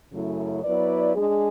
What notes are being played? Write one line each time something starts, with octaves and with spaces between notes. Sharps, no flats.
F#2 C#3 F#3 A3 E4
F#3 B3 E4 B4 D5
G#3 D4 G#4